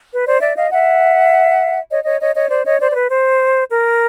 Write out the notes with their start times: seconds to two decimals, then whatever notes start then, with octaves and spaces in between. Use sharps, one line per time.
0.11 B4
0.26 C5 D5
0.41 D5 E5
0.55 D#5 F5
0.71 E5 F#5
1.90 C#5 D#5
2.05 C#5 D#5
2.20 C#5 D#5
2.35 C#5 D#5
2.50 C5 D5
2.64 C#5 D#5
2.80 C5 D5
2.90 C5
2.94 B4
3.09 C5
3.68 A#4